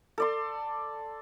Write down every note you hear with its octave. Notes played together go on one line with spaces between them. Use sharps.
A4 D5 C6